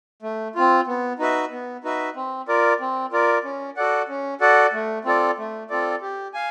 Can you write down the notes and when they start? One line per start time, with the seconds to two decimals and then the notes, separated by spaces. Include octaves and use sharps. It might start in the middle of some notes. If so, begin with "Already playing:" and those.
0.22 A3
0.55 C4 F4
0.87 B3
1.19 D#4 F#4 B4 E5
1.51 B3
1.84 D#4 F#4 B4 E5
2.16 C4
2.48 F4 A#4 D5
2.80 C4
3.12 F4 A#4 D5
3.44 C#4
3.77 F#4 A4 D5 F#5
4.09 C#4
4.40 F#4 A4 D5 F#5
4.73 A3
5.05 C4 F4 A4 D5
5.38 A3
5.70 C4 F4 A4 D5
6.02 G4
6.34 F5 G#5